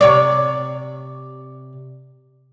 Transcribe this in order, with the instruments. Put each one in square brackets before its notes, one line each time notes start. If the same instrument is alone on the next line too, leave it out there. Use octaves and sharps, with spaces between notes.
[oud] C3 C#5 D5